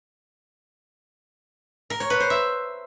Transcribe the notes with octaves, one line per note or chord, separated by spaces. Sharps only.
A#4
C#5
B4
C5
E5